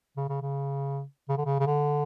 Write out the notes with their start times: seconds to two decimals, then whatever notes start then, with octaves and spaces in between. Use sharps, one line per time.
0.17 C#3
0.29 C#3
0.42 C#3
1.29 C#3
1.37 D3
1.45 C#3
1.60 C#3
1.66 D3